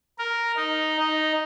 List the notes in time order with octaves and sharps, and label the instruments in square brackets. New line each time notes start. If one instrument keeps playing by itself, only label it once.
[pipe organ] A#4
D#4
D#4